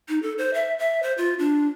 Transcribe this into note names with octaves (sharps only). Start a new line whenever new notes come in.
D#4
A4
C5
E5
E5
C5
F4
D4